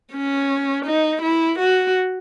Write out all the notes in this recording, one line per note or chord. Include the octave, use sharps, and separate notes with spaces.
C#4
D#4
E4
F#4